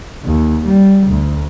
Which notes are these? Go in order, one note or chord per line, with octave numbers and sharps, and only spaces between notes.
D#2
G3
D2